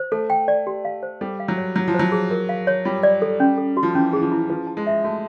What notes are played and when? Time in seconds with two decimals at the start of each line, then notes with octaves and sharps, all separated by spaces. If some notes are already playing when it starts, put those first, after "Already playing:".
Already playing: C5
0.11 A3 A4
0.30 G5
0.48 D5
0.67 G4
0.85 F5
1.03 C5
1.21 G3 A4
1.40 F5
1.48 F#3
1.57 C#5
1.76 F#3 E4
1.88 F3
1.94 C5
1.99 F#3
2.12 G#4
2.31 A#4
2.49 F5
2.67 C#5
2.85 G3 F4
3.03 D5
3.22 A4
3.40 C#4
3.58 A4
3.77 F#4
3.83 F3
3.95 E3 C#4
4.13 E3 G#4
4.22 F3
4.32 E4
4.50 F3 B4
4.67 A5
4.77 G#3
4.87 E5
5.04 A3 F#4